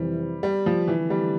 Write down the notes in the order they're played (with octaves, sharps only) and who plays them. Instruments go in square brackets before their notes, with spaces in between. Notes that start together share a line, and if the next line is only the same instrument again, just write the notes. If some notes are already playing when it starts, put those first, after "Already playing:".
Already playing: [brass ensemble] F2 C3 E3 [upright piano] G3
[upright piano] G3
F3
[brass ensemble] D3 A3 C4 [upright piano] E3
[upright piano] G3